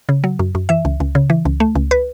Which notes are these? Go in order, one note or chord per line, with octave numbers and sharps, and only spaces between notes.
C#3
F#3
F#2
F#2
E3 E5
C#2
C#2
C#3
E3
C#2
A3
C#2
B4